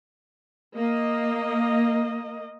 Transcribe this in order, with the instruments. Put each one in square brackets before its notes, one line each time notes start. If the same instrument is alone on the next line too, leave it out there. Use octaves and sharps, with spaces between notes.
[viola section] A#3 D#5